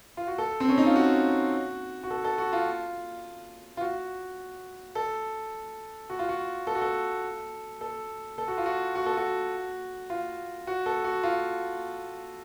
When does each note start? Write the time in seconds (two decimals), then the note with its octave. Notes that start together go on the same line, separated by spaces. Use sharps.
0.17 F4
0.27 F#4
0.38 A4
0.60 C4
0.69 C#4
0.78 D#4
0.86 F4
0.96 F#4
2.03 F#4
2.10 A4
2.24 A4
2.38 F#4
2.53 F4
3.77 F4
3.81 F#4
4.95 A4
6.10 F#4
6.19 F4
6.29 F#4
6.67 A4
6.75 F#4
6.82 A4
7.81 A4
8.38 A4
8.48 F#4
8.58 F4
8.66 F#4
8.95 F#4
9.06 A4
9.17 F#4
10.10 F4
10.67 F#4
10.86 A4
11.04 F#4
11.23 F4